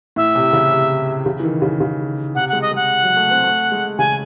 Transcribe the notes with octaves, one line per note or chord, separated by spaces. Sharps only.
A2 E5
C3
C#3
C3
C#3
E3
D#3
C#3
C#3
C3 F#5
G#3 F#5
D#5
G#3 F#5
F#3
A3
C4
A3
G#3
C#3 G#5